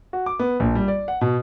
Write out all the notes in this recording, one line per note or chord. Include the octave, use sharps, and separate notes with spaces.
F#4
D6
B3
A#1
G3
D5
F#5
B2